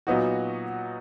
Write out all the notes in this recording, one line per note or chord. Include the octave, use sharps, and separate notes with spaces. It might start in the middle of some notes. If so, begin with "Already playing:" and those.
A#2 F#3 B3 D#4 F#4